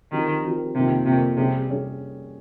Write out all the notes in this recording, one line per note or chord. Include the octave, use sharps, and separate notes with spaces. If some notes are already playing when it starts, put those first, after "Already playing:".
D#3 F3 C4 G4 A#4
F3 C4 G4 A#4
F2 C3 D#3 A#3 F4 A#4
F2 C3 D#3 A#3 F4 A#4
C3 G3 C#4 G#4
G3 C#4 G#4